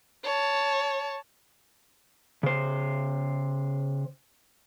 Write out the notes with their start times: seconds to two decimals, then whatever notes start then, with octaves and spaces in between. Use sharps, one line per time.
0.24 C#5 A5
2.43 C#3 C5